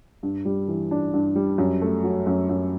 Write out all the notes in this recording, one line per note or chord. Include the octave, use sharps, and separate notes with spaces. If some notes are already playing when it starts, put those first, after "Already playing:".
G2
G3
E3
D4
G2
G3
F#2
A3
F#3
F#2
F#2